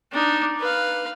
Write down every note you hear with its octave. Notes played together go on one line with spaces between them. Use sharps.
D4 D#4
B4 F5